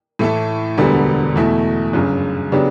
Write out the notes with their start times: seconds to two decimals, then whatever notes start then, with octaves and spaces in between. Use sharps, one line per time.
0.19 A2 E3 A3 E4 A4
0.78 E1 D2 D3 G3 B3
1.36 E2 B2 A3 E4
1.93 G1 F#2 C#3
2.52 C#3 F#3 B3 D4 G4